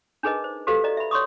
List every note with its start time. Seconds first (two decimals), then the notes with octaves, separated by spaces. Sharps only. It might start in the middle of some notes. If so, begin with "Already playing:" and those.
0.23 D4 D#4 G#4 A#4 B4 D#5
0.44 C5
0.67 F#4 G4 A4 B4 C5 F5
0.84 D5 D#5 A#5
0.97 E5 B5
1.11 C#5 C6 C#6 D#6